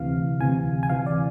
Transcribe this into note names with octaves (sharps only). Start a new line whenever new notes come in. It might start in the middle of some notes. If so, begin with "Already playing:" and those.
Already playing: D2 C3 E3 F5
D2 C3 E3 G#5
G#5
D2 C3 E3 F5
D5